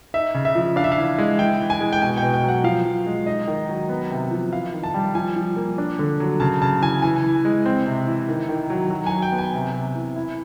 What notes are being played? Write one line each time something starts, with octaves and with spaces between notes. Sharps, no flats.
D#4 E5
C#3
E5
F3
D4 F5
E5
F5
E3
G#3
E3 G5
E3
G#5
G#3
G5
B2 G#5
G5
B2
G5
F#3
F#5
F3 F5
F3
G#3
D#4 D#5
D#3
F#3
B3
C3
F3
E4 F5
D#3
A5
G3
F3 G#5
F3
A#3
D4
D3
F#3
C#3 A5
C#3 A5
E3 G#5
E3 G#5
E3
G#3
C4
C3
E3
D#3
D#3
F#3
F#3
G#5
F#3
G5
B3
G#5
C3
C3
E3
E4